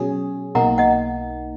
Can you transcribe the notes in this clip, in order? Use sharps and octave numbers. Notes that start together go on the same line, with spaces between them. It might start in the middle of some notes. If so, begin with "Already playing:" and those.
Already playing: B2 F#3 C#4 G#4
B1 B2 A#3 D#4 F#5 A#5
D#5 F#5